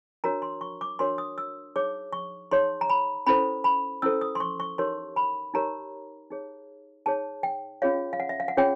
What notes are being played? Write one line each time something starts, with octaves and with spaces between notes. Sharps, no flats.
D4 F#4 A#4 C#5 A#5
C6
C#6
D6
D4 F#4 A#4 C#5 C6
D#6
E6
D#4 G#4 C#5 D6
C#6
D#4 G#4 C#5 C6
A#5
B5
C#4 E4 A4 C5 B5
B5
C#4 E4 A4 C5 E6
D#6
C6
C#6
C#6
D#4 G4 A#4 C#5 C6
B5
D#4 G4 A#4 C#5 A#5
D#4 G#4 C#5
D#4 G#4 C#5 A5
G5
C#4 F4 G#4 C#5 F5
F5
F#5
E5
F5
F#5
C#4 F4 G#4 C#5 G5